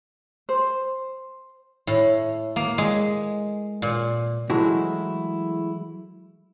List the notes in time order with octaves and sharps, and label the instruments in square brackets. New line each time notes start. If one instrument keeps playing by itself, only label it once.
[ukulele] C5
[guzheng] A2
A#3
G#3
A#2
[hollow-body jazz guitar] E3 F#3 G#3 A3 E4 F#4